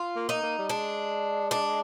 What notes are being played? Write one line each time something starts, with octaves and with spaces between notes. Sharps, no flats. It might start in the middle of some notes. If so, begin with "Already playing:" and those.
Already playing: F4
A#3
D#4
A#3
G3
G#3 D4
D4